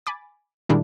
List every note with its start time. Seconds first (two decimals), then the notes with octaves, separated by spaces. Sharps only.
0.06 G#5 B5 D6 A6
0.69 A#2 D#3 G3 G#3 D4 E4